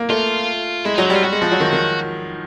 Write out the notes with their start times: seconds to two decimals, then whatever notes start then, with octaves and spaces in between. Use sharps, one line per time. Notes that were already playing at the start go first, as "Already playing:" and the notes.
Already playing: A#3
0.10 A3 F4
0.85 G#3 E4
0.95 F#3 D#4
1.04 E4
1.10 G3 F4
1.23 G3 F#4
1.32 G#3
1.42 F3
1.52 F#3
1.60 D#3
1.73 D#3